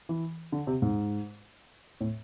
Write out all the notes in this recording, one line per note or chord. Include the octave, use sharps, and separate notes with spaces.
E3
D3
C3
G#2
A2